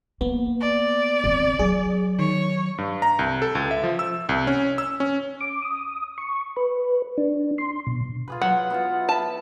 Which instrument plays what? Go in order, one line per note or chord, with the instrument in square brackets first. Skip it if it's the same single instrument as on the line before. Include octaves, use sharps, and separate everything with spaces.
[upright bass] A#3 [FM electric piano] B3
[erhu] D5
[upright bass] D#3 C4
[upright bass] F#3 [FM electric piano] G#4
[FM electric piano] D#3 [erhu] C#5
[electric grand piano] G2
A#5
C2
A4
C#2
E5
F3
E6
C2
C#4
E6
C#4
[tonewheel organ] D6
D#6
C#6
B4
D4
C6
B2
[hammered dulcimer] F4 G#4 B4
[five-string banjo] F#3 [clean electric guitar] F#5
[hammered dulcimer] B3 E4 F4
[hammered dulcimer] E5 B5 [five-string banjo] A5